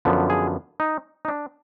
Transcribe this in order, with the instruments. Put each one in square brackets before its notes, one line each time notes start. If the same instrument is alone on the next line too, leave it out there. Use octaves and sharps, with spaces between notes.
[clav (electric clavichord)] F#2 D3 F3 B3
G#4
D#4
D#4
D4